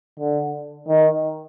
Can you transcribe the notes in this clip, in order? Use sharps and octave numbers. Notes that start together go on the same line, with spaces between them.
D3
D#3